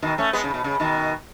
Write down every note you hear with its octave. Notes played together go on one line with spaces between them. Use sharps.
B2 D#3
A3 C#4
G#3 B3
C#3
B2
C#3
B2 D#3